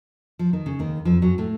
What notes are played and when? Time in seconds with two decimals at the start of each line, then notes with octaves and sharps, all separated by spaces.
0.39 F3
0.53 D#3
0.66 C#3
0.79 D#2 D#3
1.05 F2 F3
1.22 F#2 F#3
1.38 A2 A3